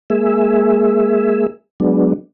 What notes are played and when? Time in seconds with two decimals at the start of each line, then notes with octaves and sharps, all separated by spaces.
0.10 G#3 A#3 G#4 E5
1.80 F#3 G#3 B3 D4